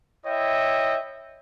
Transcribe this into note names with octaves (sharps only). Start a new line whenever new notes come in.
E4 C#5 D#5 E5 G5